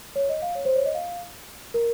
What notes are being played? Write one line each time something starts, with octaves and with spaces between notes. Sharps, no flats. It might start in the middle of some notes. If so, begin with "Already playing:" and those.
C#5
D#5
F5
C#5
C5
C#5
D#5
F5
A#4